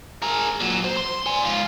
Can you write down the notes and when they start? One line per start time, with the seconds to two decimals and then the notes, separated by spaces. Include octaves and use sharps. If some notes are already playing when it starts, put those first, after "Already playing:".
0.22 G#4 A#4
0.60 A#2 F#3
0.84 C5
0.97 C6
1.26 D5 G#5
1.45 G#2 F4